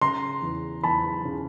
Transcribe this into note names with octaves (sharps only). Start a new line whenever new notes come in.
C#3 A#5 C6
E2
E2 A5 B5
C#3